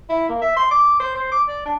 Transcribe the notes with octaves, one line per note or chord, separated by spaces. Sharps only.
E4
A#3
E5
C6
D6
C5
C5
D6
D5
D4